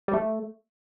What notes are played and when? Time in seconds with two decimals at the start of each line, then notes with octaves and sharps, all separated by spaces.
0.08 G3
0.13 A3